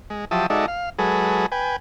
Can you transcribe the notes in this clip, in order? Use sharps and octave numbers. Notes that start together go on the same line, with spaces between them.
G#3
F3 F#3 G4 E5 A5 D#6
G#3 D#4 F#4 A4 D5 E5
F5
F#3 G#3 G#4 A4 B4
B4 G5 G#5